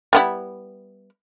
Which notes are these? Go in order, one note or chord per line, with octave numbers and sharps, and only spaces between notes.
G3 B3 E4